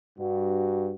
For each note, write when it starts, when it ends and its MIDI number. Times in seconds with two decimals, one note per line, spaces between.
0.18 0.94 43
0.18 0.94 66